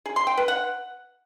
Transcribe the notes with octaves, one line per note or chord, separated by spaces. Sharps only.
G#4
C6
G5
B4
F#5